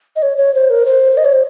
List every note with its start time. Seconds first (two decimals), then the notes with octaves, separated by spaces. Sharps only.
0.16 D#5
0.22 C#5
0.38 C#5
0.54 C5
0.70 A#4
0.86 C5
1.17 D#5
1.25 C#5
1.33 C5